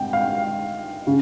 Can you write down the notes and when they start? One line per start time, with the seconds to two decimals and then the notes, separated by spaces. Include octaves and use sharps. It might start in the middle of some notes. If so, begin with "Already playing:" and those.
Already playing: G5
0.13 F5
1.07 C#3